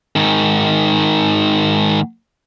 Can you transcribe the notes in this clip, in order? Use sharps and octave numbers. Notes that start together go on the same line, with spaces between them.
G#2 D#3